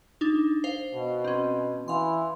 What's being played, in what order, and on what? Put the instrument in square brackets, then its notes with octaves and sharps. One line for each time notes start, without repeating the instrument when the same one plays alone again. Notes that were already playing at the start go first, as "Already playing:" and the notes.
[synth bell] D4 D#4
C5 F5
[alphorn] B2
[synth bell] C4 C#4
[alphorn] E3 [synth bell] F5 C6